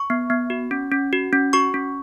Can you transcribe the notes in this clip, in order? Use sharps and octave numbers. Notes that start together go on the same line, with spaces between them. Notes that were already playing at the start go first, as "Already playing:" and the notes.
Already playing: C#6
B3
B3
F#4
C#4
C#4
F#4
C#4
F#4 C#6
C#4